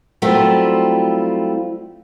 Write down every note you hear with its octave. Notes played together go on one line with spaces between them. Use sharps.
F#3 G3 A3 C4 E4 F4